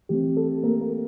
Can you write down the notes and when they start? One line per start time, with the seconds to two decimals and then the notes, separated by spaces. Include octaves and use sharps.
0.09 E3 A3 C4 G4
0.37 A4
0.63 A#3 A#4
0.81 A#3 A#4